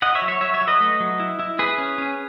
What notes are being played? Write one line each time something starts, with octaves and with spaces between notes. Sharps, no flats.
E4 D#5 F#5
C#5 E5
F#3
C#5 E5
F#3 C#5 E5
C#5 E5
F#3
B4 D#5
A3
F#3
E4
E4
E4 G#4 B4
C#4
C#4